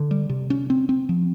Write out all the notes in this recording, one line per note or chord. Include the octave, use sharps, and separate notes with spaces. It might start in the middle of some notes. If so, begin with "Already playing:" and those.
Already playing: D3
G3
C3
C#4
C4
C4
F3